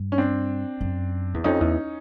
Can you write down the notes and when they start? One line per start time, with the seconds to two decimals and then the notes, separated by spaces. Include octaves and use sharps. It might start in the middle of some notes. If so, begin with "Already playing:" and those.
Already playing: G2
0.12 C#4
0.18 C4 D4
0.81 F#2
1.34 E2
1.44 F2 C#4 D#4
1.60 E2